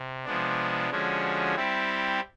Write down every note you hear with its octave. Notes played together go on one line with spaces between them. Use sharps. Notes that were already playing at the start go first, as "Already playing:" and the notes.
Already playing: C3
C3 F3 G#3 B3 D4
D3 F3 G#3 C#4 F#4
G3 C4 E4 G4